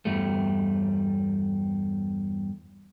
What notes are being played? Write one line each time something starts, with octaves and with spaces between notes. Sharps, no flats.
E2 G2 G3 A3